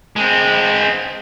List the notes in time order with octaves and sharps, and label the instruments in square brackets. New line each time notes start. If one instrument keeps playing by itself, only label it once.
[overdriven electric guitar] G#3 C4